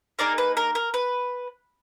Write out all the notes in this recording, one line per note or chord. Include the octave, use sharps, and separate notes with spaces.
A#3 D#4 G#4 A#4 D5
B4
A#4
A#4
B4